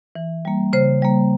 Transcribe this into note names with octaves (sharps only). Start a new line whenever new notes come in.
E3
G3 A#3
C#3 C5
G3 A#3